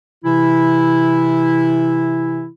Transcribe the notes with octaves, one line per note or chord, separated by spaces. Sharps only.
C3 E3 E4